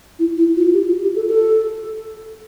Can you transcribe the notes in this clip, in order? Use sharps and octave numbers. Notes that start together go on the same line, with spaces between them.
E4
E4
F4
G4
F4
G4
A4
A4